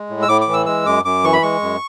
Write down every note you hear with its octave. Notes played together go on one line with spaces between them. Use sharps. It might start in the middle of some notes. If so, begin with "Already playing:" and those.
Already playing: G#3
A2
E6
A2 D6
D6
E3
E6
G#3 E6
F#2 D6
F#2 D6
E3 C#6
B5
G#3 C#6
F#2